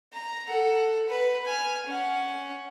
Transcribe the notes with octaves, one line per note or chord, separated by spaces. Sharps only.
A#5
A4 F#5
B4
G#5 F6
C#4 F#5